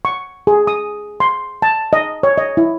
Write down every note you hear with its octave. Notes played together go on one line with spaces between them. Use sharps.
C#6
G#4
D#6
C6
A5
D#5
C#5
D#5
E4